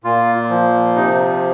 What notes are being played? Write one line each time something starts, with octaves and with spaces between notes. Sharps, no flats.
A#2 F4
F3
C3 D#4